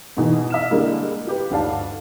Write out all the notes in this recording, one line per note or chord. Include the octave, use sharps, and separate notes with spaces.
G#2 B2 E3
E5 F6 E7
D3 G3 G#3 A#3 D4 E4
F4 G4 B4
G1 D2 G#2 D4 F5 A5